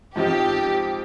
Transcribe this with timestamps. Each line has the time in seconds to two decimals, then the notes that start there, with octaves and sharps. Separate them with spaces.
0.16 G#2 F3 C4 D#4 G4